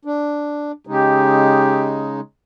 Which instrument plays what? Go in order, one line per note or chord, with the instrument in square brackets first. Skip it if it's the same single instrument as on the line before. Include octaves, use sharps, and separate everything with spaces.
[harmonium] D4
[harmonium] C#3 G#3 D#4 [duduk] G4